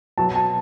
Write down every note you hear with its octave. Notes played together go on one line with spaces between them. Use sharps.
B2 F#3 B3 F#4 A5
A5